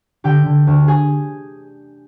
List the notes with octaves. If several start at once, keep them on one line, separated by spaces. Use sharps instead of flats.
D3 G4 G5
D3
D2
G#4 G#5